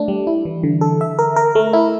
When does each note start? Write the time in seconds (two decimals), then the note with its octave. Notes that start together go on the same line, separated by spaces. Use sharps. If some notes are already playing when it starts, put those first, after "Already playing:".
Already playing: A3 D4
0.08 G3
0.27 E4
0.45 E3
0.63 D3
0.81 A4
1.01 E5
1.19 A#4
1.36 A#4
1.55 A3
1.73 E4